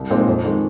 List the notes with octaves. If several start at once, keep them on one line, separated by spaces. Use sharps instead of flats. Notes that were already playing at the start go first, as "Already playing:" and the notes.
Already playing: C2
A#2 G#3 C4 D#4
F2
D#3 G#3